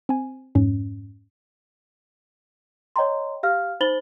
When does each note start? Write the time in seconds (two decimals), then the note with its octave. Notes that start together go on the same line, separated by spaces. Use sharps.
0.09 C4 G#5
0.55 F2 G#2 C#4
2.96 C#5 D#5 G5 A#5 C6
3.43 G4 F5 F6
3.80 D#4 C5 B5 A6 F#7 G7